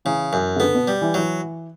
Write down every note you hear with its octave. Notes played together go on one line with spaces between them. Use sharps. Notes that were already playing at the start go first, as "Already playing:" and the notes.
C#3 E3
F#2
C#3
D3 B3
B2
G3
E3
E3 F#3